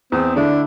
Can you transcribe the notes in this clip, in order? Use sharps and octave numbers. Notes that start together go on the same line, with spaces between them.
E2 C4
D3 A3 D4 E4